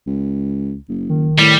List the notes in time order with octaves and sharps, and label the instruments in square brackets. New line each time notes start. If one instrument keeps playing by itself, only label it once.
[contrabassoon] C#2
F#1
[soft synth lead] D#3
[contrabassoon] A2 [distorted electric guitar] G3